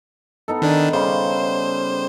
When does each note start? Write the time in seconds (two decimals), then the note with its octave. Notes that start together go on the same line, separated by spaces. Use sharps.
0.48 B3 D#4 A4
0.62 D#3 D4 B4 G#5
0.93 C#3 G3 C5